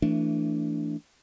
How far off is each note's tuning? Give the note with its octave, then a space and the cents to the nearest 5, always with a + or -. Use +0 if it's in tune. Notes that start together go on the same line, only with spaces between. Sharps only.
E3 +5 A3 +20 D4 -10